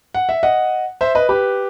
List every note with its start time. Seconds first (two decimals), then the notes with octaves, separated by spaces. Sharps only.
0.14 F#5
0.29 E5
0.43 D#5 F#5
1.01 C5 E5
1.15 B4 D#5
1.29 G4 B4